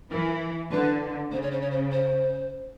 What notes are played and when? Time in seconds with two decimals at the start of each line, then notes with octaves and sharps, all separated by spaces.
0.11 E3 A#4
0.71 D3 B4
1.31 C#3 C5
1.41 C#5
1.51 C5
1.61 C#5
1.71 C5
1.92 C5